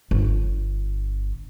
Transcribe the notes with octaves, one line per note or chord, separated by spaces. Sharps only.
G1